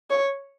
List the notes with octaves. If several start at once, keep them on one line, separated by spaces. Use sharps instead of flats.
C#5